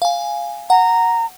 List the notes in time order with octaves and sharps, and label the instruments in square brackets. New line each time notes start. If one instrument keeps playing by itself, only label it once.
[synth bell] F5 G#5
[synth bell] F#5 [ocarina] A#5